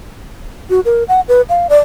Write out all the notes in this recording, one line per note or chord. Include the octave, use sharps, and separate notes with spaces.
F#4
A#4
F#5
B4
F5
D5